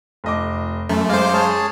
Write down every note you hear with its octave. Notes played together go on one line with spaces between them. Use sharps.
F1 D#5 D6
F#2 A3
G#3 C5 F5 D6
G#4 C#5 A5